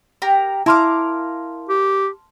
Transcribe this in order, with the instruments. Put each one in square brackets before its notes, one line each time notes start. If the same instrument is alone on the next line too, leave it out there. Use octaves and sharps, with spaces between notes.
[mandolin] G4 A#4 A#5
[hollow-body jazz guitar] E4 [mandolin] A#4 F5 D6 [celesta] A5 C6 F6
[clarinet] G4